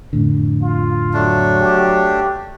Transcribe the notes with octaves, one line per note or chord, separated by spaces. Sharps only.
F2 A2 D3
F4
F#3 A3 D4
G4